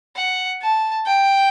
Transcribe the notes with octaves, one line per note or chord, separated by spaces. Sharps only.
F#5
A5
G5